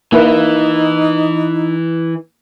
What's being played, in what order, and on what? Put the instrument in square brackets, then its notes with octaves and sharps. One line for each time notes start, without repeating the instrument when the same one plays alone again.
[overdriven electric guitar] E3 [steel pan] A#3 E4 B4 [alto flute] D#4